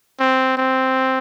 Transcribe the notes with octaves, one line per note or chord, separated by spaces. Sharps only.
C4
C4